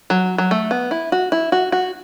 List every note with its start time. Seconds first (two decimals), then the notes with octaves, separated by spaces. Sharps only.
0.10 F#3
0.38 F#3
0.51 A3
0.71 B3
0.91 E4
1.12 F#4
1.32 E4
1.52 F#4
1.72 F#4